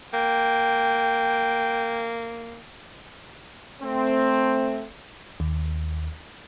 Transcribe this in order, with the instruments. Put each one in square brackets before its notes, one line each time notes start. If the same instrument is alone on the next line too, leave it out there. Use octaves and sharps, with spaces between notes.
[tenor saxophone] A#3 [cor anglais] G5
[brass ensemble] A3 C4
[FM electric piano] D#2